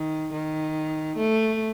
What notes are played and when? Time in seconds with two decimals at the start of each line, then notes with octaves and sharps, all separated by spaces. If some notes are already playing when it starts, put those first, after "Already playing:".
Already playing: D#3
0.33 D#3
1.17 A3